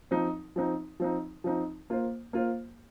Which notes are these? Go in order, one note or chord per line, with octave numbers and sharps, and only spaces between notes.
F3 C4 D#4
F3 C4 D#4
F3 C4 D#4
F3 C4 D#4
A#3 F4 C5
A#3 F4 C5